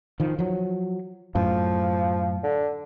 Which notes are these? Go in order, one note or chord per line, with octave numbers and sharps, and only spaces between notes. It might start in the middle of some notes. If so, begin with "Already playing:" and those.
D#3 F3
F3 F#3
F#2 A2 F3
D3